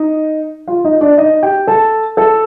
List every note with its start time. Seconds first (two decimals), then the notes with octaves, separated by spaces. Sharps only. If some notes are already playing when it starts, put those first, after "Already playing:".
Already playing: D#4 D#5
0.68 F4 F5
0.84 D#4 D#5
1.01 D4 D5
1.18 D#4 D#5
1.42 G4 G5
1.67 A4 A5
2.17 A4 A5